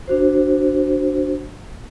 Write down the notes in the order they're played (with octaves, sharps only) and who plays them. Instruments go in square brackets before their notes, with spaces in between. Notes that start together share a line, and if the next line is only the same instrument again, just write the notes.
[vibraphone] D4 F#4 C5